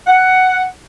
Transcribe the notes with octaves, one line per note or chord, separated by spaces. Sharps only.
F#5